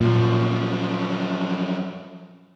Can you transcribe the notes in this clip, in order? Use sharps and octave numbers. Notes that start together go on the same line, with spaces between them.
F#2 A#2 F3